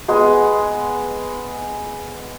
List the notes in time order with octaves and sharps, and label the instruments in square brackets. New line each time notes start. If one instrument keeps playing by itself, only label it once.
[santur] G#3 B3 G#4